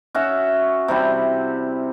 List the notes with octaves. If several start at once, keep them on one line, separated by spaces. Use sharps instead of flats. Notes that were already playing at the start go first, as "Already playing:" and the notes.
C#4 F#4 E5
C3 G3 E4